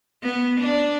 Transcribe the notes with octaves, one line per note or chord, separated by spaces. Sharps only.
B3
D4